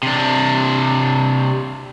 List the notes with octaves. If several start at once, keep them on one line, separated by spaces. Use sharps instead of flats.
C3 D4